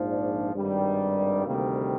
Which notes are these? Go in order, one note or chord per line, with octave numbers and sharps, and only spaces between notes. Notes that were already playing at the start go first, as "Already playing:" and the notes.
Already playing: A#1 G#2 F3
D4
G#1 G2 D#3 G3
D2 C3 D#3 G3 A#3